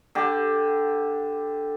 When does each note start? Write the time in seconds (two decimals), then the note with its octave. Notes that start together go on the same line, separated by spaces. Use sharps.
0.15 D3 G4 D6